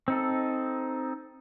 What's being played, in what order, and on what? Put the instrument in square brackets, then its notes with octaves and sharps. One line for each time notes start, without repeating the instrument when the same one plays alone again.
[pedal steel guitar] C4 D#4 A4